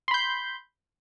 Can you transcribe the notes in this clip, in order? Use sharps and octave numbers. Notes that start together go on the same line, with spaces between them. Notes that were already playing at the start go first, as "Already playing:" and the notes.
B5 C6 G6